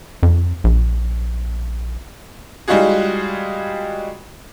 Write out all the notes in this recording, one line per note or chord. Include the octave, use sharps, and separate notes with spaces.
F2
A#1
G3 G#3 D#4 F4 F#4 G#4